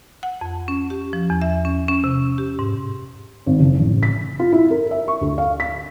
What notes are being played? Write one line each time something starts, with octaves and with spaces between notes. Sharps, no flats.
F#5
F2
C#4
G4
F3
E2
E5
C#4
C#4
C3
G4
G#2
G#1
F#1
A1
B6
F4
E4
A#4
E5
C#6
D2
F5
B6